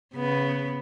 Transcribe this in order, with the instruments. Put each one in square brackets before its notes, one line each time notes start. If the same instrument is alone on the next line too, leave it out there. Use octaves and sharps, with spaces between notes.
[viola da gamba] C#3 B3